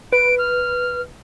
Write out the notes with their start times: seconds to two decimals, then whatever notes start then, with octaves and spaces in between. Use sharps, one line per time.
0.12 B4 D7
0.39 F6